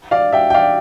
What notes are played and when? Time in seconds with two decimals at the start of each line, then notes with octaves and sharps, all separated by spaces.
0.11 D5 F5
0.33 E5 G5
0.50 G5
0.54 D5 F5